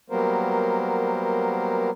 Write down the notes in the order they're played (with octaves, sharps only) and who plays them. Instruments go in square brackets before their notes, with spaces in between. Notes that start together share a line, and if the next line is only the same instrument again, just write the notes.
[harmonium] F#3 G3 A#3 B3 A#4 C5